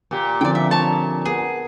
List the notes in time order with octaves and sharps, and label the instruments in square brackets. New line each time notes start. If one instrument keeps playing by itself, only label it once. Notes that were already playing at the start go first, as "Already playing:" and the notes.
[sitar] A#2 G4
[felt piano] D3 F3 C4 [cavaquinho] D5 G5
[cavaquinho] E5
C#5 A5
[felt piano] B3 A#4 F#5 [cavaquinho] G#4